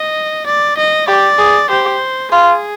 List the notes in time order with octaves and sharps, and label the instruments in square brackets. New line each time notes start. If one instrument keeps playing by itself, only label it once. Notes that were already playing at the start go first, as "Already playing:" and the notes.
Already playing: [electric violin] D#5
D5
D#5
[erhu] G4 [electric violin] D5
[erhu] G#4
[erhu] G4 [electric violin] C5
[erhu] F4 [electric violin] G#4